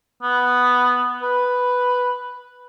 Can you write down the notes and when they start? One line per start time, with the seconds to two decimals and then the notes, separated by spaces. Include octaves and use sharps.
0.23 B3
1.22 B4